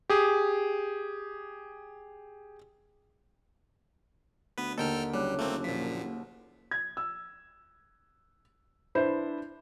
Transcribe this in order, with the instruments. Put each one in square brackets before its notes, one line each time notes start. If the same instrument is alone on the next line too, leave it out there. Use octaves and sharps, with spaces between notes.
[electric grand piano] G4 G#4
[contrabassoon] D2 [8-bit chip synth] B3 B4
[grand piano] D#2 D3 [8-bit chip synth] A4 G5 F6 [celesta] A#4 D#5 A#5
[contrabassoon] F#1 [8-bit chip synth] G3 [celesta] C#5 D6 F#6
[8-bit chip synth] A3 A#3 C4
[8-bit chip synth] A#2 F3 [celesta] B6
[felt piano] G#6
E6
D4 E4 B4 C5